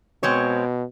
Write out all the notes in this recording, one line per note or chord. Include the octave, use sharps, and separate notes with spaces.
B2 G#3 C4 C#5